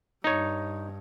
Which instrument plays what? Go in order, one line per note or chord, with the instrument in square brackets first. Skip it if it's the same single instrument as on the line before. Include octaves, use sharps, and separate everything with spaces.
[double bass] G2 [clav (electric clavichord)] D#4 C#5